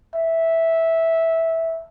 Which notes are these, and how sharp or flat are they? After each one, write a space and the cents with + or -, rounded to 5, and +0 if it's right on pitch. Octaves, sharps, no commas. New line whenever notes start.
E5 -10